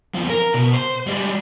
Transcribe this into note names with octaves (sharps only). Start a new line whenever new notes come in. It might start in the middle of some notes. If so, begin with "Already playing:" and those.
E2 F3
A#4
B2
C5
G3 G#3